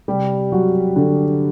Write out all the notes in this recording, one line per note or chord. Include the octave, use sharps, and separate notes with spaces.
C3 G3 G4
F#3 F#4
D3 D4